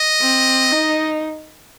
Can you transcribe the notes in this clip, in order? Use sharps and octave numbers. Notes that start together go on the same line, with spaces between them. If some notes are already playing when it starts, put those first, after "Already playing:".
Already playing: D#5
C4
D#4